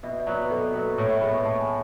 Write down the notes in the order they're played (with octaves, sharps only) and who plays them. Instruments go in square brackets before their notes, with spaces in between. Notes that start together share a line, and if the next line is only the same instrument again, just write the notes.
[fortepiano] B2 [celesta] E5
[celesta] D5
[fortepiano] F#3 B3
[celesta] B4
[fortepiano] B2 [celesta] A4
[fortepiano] F#3 B3 [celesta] B4
[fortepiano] A2 [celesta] C#5
[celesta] E5
[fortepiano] G#3 B3 [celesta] B5
[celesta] C#6
[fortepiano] A2 [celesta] A5
[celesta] G#5